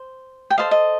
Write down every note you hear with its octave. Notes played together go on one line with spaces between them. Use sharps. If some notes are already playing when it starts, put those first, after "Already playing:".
Already playing: C5
G5
A4 C5 D#5 F5
D#5